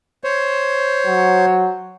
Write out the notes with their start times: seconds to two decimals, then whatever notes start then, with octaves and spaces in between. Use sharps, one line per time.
0.24 C5 C#5
1.07 F#3